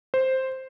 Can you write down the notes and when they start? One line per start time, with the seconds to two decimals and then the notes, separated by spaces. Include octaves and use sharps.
0.14 C5